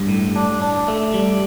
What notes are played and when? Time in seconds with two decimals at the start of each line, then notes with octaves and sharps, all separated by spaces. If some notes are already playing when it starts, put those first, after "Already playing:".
Already playing: G2
0.08 A2
0.36 D4
0.62 D4
0.88 A3
1.14 G3